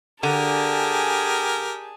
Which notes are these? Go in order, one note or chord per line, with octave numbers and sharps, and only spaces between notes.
D3 G4 G#4 A#4 G#5 A5